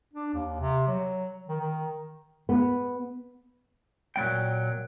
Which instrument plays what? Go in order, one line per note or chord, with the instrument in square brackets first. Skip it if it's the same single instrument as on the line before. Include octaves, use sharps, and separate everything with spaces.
[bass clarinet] D4
D#2
C3
F#3
D#3
D#3
[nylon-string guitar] B3
[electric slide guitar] A#2 F#3 A#3 G5